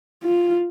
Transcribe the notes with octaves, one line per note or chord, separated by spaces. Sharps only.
F4